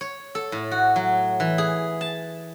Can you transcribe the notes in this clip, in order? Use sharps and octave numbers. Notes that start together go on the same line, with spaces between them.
C#5
A4
A2
F#4
F#3
E3
G#4
A5